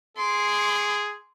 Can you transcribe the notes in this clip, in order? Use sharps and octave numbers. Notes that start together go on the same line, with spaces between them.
G#4 C6 D6